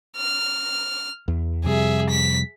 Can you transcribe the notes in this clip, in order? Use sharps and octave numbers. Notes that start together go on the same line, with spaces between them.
F6
E2
F2 C3 G3 G#4 E5
B6